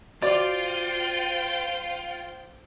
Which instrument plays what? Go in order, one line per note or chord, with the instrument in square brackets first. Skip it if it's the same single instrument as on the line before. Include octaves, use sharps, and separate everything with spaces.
[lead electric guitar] F4 [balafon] F#4 [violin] C5 G5 [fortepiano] D5